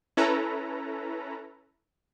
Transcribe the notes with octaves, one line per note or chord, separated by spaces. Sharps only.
C#4 E4 A4 B4 A#5